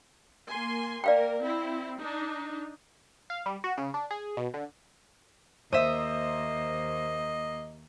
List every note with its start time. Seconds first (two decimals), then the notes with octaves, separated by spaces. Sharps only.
0.49 A#3 G#5 C6
1.04 A#3 A#4 D5 F5 G5
1.41 C4 E4
1.98 D4 D#4
3.30 F5
3.46 G3
3.64 F#4
3.77 C#3
3.94 D4
4.11 G#4
4.37 B2
4.54 D3
5.73 D#2 A#3 C5 D#5 E5 D#6